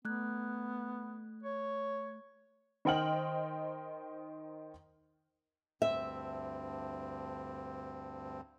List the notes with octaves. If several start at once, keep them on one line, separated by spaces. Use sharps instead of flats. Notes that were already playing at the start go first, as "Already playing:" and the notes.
A3 B3 F#6 G#6
C#5
D#3 C5 D#5 G5 F6 F#7
D2 G2 C4 E5